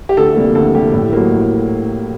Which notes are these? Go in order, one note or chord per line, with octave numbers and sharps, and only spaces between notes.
G4
D2 A4
C3 G3 A#3
D2 A4
C3 G3 A#3 G4
A2
F#3 A#3
A2